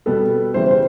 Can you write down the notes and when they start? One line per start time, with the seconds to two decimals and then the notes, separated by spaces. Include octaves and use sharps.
0.06 B2 G3 B3 A4
0.54 C#3 E3 G3 C5
0.71 C5